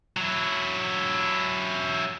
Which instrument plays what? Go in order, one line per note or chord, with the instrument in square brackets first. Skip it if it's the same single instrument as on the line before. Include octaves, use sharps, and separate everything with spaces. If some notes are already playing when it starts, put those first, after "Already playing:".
[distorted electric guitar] F#3 E4